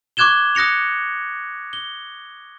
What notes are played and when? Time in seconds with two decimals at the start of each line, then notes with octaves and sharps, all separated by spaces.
0.17 C#6 D6 F#6 G#6 E7 G7
0.55 D#6 F#6 A#6 C#7 F7
1.73 G7